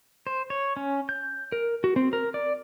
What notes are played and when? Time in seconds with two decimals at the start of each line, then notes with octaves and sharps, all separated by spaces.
0.27 C5
0.50 C#5
0.77 C#4
1.09 G6
1.52 A#4
1.84 F#4
1.96 C4
2.13 A#4
2.34 D5